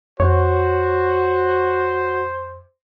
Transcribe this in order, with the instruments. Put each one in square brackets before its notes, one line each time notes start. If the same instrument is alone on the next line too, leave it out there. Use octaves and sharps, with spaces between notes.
[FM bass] F2 [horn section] F#4 [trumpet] C5 [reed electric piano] C#5